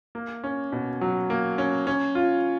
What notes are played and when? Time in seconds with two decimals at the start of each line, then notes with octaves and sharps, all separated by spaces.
0.15 A#3
0.44 C#4
0.72 B2
1.01 F#3
1.30 A#3
1.58 C#4
1.87 C#4
2.15 F4